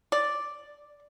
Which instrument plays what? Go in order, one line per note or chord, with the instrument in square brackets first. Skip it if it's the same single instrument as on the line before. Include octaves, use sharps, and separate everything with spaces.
[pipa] D5